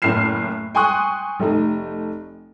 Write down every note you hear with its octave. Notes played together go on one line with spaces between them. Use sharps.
F#1 A2 F6 C7 E7
G5 G#5 C6 C#6 D#6 F#6
F1 A3 D#4